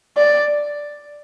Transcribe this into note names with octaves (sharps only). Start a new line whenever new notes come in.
D5